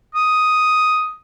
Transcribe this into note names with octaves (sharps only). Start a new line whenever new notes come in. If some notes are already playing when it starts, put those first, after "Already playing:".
D#6